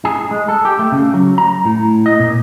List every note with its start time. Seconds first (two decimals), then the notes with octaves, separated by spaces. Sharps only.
0.05 G#4
0.31 G#3
0.48 A4
0.65 G4
0.79 A3
0.92 C#3
1.14 F#3
1.38 A#5
1.65 A2
2.06 D#5
2.20 A#2